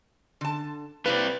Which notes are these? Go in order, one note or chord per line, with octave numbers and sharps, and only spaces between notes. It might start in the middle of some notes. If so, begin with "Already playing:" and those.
D3 A5
G3 A#3 C4 E4 B4 F5